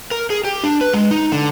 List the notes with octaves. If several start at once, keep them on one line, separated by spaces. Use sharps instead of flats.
A#4
G#4
G4
D4
B4
G#3
D#4
D3